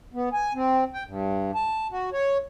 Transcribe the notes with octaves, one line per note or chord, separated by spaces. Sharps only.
B3
G#5
C4
G5
G2
A5
F#4
C#5